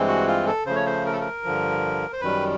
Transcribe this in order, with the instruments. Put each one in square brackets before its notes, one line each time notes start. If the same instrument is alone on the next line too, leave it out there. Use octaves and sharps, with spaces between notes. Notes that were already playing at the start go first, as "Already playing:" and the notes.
Already playing: [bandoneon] G2 E3 G#3 C4
F#4
F4
A4
C#3 F3 A3 C5
C#5
C5
A#4
A4
A#4
G2 D3 F3
C5
F#2 D#3 G3 B4